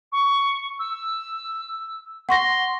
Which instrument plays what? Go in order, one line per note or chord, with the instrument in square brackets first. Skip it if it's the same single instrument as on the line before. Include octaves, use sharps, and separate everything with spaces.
[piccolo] C#6
E6
[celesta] F#5 C#6 A#6 [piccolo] C6